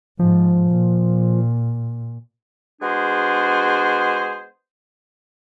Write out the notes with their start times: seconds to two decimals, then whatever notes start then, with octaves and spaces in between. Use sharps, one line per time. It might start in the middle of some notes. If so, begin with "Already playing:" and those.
0.19 G#2 F3
0.70 A#2
2.81 G#3 B3 D4 F#4 G#4 C5